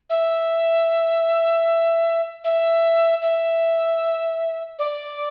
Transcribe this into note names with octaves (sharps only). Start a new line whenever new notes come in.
E5
E5
E5
D5